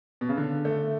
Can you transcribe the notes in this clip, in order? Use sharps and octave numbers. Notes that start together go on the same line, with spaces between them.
B2
C#3
D3
A3